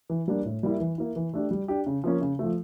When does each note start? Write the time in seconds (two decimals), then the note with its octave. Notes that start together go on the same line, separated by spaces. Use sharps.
0.10 E3
0.28 G3 A#3 D4
0.45 A2
0.63 G3 A#3 E4
0.80 E3
0.98 A#3 E4
1.16 E3
1.34 A3 D4 G4
1.51 G3
1.68 D4 G4
1.86 C#3
2.04 F3 A#3 C#4
2.21 C#3
2.39 F3 A3